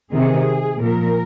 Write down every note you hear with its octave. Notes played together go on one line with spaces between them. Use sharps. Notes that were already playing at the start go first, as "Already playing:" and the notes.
C3 D#3 G#4
A#2 F3 A#4